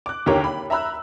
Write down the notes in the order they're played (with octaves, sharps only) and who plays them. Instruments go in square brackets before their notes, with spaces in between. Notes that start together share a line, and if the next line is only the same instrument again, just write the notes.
[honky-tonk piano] D6 F#6
D#2 D3 G4 A#4 C#5 D6
B5
E5 A#5 B5 E6 F#6